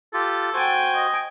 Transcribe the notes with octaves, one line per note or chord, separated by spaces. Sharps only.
F4 G4 A4
F#4 C5 G5 G#5
D#5